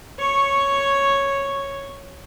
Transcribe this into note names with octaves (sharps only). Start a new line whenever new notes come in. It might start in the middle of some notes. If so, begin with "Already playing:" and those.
C#5 C#6